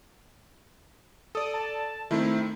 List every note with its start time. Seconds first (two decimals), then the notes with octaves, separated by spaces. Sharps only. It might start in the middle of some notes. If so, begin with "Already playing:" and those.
1.35 A4 D5 D#6
1.54 A5
2.11 D#3 A3 C4 E4